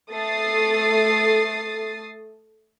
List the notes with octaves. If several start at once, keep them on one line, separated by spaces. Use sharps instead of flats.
A3 D#6 A6 C7